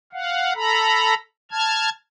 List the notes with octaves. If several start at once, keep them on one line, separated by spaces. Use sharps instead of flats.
F5 F#5
A4 A#5 B5
A5 F6 G#6